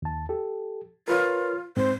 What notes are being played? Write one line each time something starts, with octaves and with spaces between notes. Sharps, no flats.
D#2 A5
G4 A4
F4 A#4 B4 C#5
G#2 C4 C5